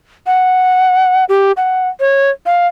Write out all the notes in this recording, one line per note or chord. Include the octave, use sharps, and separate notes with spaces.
F#5
G4
F#5
C#5
F5